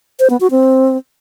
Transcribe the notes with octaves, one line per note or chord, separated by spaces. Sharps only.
C5
B3
F#4
C4